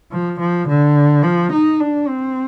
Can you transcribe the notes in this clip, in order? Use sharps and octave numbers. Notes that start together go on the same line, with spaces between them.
F3
F3
D3
F3
D#4
D4
C4